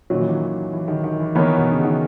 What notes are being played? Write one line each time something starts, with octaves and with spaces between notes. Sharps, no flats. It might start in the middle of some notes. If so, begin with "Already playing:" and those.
A#2 D#3 F#3 C#4
E3
D#3
E3
D#3
D#3
E3
D#3 E3 B3 D#4 A#4 C#5
B2
C#3
D#3